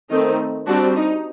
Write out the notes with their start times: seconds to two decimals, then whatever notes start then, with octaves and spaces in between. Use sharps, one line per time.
0.10 D#3 A3 C4 D#4
0.67 G3 C4 D4 F#4
0.96 D#4